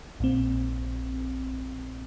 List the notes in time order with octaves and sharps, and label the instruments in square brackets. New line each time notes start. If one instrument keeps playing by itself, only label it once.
[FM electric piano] A#1 A#2 C4